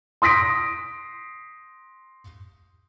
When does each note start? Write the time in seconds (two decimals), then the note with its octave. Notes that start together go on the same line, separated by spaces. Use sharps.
0.22 C6 D#6 A#6 B6 D7